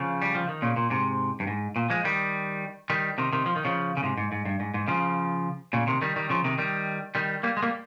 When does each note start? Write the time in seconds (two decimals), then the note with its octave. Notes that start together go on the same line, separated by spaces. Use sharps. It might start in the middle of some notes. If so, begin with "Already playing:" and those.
Already playing: C#3 F3
0.22 G3
0.35 F3
0.48 D#3
0.62 A#2 C#3
0.76 A#2
0.90 G#2 C3
1.40 G2
1.47 G#2
1.76 A#2
1.90 F3 G#3
2.04 D#3 G3
2.90 D#3 G3
3.18 C3 D#3
3.33 C3 D#3
3.46 F3
3.56 D#3
3.65 C#3 F3
3.97 C#3
4.03 G#2 C3
4.18 G#2
4.32 G#2
4.45 G2
4.60 G#2
4.74 G#2
4.88 C#3 F3
5.73 A#2 C#3
5.87 C3 D#3
6.02 D#3 G3
6.16 D#3 G3
6.29 C#3 F3
6.44 C3 D#3
6.58 D#3 G3
7.15 D#3 G3
7.43 G3 A#3
7.57 G#3
7.62 G3 A#3